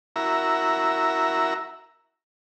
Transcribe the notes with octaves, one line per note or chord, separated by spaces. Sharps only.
E4 F#4 A#4 E5 A#5